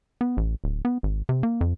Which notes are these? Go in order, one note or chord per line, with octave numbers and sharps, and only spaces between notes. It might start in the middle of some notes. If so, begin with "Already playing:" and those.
B3
A1
D1
B3
G#1
C3
A#3
F2